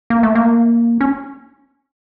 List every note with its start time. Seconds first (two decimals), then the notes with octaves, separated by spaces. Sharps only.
0.10 A#3
0.23 A3
0.35 A#3
1.01 C#4